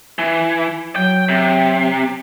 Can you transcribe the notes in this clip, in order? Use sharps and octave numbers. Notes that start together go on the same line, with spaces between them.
E3
F#3 G5
C3